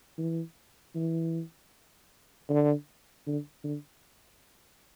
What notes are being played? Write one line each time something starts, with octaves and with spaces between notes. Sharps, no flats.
E3
E3
D3
D3
D3